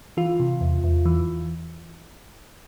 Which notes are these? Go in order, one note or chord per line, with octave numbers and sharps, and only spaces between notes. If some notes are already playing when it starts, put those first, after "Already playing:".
E3 F4
C3
E2
E2
E3